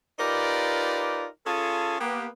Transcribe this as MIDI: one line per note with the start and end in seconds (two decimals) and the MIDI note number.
0.19 1.26 63
0.19 1.26 65
0.19 1.26 67
0.19 1.26 70
0.19 1.26 71
0.19 1.26 74
1.46 1.97 61
1.46 1.97 65
1.46 1.97 68
1.46 1.97 69
2.00 2.26 58
2.00 2.26 59
2.00 2.26 67